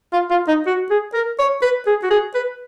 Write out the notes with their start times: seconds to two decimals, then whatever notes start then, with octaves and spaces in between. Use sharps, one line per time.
0.13 F4
0.30 F4
0.48 D#4
0.67 F#4
0.90 G#4
1.14 A#4
1.39 C#5
1.62 B4
1.87 G#4
2.03 F#4
2.11 G#4
2.35 B4